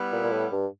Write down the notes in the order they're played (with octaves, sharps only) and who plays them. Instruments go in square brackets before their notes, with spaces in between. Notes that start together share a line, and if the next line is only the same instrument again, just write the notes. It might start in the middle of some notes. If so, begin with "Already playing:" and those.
Already playing: [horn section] G3 B3 E4
[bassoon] A#2
A#2
A2
G2